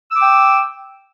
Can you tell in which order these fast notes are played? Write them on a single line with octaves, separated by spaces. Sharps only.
E6 D6 G5